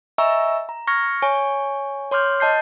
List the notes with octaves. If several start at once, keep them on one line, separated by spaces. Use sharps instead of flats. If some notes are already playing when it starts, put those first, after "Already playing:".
D#5 E5 G#5 A#5 C#6 E6
A#5
C#6 F6 G#6 A#6 C#7
C#5 G#5 C#6
C#5 C6 D6 F6 G6
D#5 A5 G6 C7